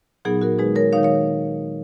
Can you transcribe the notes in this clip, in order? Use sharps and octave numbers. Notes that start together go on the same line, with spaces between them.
A#2 F#3 B3 D#4 G#4
F#4 A#4
D#3 G#3 D#4 G#4 B4
A#4 C#5
D#3 G#3 D#4 C#5 F5
C#5 F5